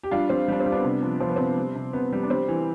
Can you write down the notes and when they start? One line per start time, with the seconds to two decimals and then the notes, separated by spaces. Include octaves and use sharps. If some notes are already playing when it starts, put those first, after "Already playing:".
0.03 G4
0.11 G3 D4 F4
0.29 G3 C4
0.48 G3 D4
0.60 C4
0.66 G3
0.72 B3 D4
0.84 C3
1.03 F3
1.20 F3 C4
1.29 B3
1.36 C3 C4
1.57 G3
1.75 C3
1.93 C3 B3
2.12 G3
2.23 D4
2.30 G3 C4
2.48 E3